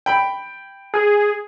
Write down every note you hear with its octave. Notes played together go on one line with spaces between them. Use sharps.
G5 B5
G#4